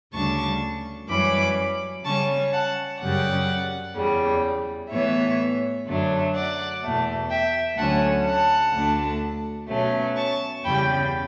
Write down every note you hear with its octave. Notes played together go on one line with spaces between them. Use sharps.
D2 C#3 G3 D4 A5 C#6
F#2 E3 G3 C#4 B5 D6
C#3 G3 C#4 A5 C#6
F#5 A5
F#2 C#3 G3 D5 F#5
E2 C#3 G3
A2 E3 B3 C#5 E5
F#2 D3 F#3 A3 D4
D5 F#5
E2 B2 A3
E5 G5
D2 D3 F#3 A3 C#4 F#5 A5
F#5 A5
D2 D3 A3 D4
B2 F#3 A3 C#4
A5 C#6
E2 C#3 G3 G5 B5